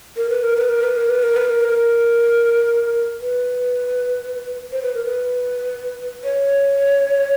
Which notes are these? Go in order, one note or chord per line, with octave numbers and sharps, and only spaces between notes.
A#4
B4
A#4
B4
A#4
B4
A#4
B4
A#4
B4
A#4
A#4
B4
C5
B4
A#4
B4
C#5